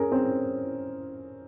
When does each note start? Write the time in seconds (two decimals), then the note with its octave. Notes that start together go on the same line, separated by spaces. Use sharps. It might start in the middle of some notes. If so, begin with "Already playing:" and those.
Already playing: C#4 G#4 A#4
0.12 C4